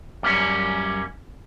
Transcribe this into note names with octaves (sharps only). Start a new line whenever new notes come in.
F#2 G3 A#3 C#4